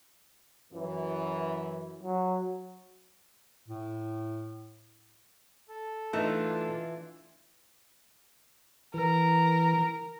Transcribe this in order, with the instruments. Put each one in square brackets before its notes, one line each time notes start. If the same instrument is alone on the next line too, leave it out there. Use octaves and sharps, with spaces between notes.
[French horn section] F#2 E3
[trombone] F#3
[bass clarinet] A2
[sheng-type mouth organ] A4
[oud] E3 [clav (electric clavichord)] A3 D#4 [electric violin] D4 F4
[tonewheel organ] E3 [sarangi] A#4